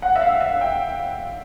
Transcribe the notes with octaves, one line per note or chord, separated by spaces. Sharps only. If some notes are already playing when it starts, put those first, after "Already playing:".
F#5
E5
F5
E5
G5